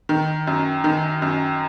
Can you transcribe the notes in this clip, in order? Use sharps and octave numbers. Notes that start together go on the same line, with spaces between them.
D#3
F#2
D#3
F#2